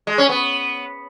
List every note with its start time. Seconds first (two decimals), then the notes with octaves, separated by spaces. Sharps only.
0.07 G#3
0.18 C#4
0.29 B3